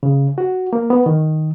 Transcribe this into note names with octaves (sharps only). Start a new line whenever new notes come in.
C#3
F#4
A#3
B3
D#3